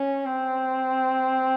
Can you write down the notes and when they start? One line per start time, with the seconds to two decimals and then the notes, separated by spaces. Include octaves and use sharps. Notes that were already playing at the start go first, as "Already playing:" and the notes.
Already playing: C#4
0.25 C4